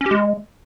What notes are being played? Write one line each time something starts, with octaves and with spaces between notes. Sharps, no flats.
C#4
G4
G#3